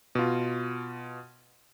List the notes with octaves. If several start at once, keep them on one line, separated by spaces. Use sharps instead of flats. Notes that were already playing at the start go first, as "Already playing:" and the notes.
B2 F4